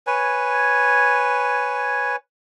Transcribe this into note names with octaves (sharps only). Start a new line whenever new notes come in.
B4 C#5 G#5